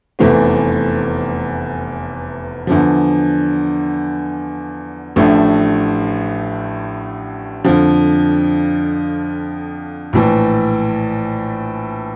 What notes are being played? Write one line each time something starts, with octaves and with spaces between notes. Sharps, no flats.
F1 E2 E3 A3 C4
E2 D3 F3
A1 A2 F3 A3 D4
F2 D3 F3
A#1 A2 E3